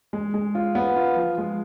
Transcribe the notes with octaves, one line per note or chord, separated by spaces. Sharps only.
G#3
G#3
F4
B3
F4
F3
G#3